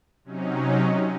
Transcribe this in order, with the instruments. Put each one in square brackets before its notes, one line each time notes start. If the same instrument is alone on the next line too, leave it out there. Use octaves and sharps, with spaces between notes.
[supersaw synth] C3 F#3 C#4 D#4